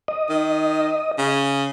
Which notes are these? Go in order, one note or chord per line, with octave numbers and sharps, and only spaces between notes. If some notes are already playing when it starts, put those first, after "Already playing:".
D#5
D#3
C#3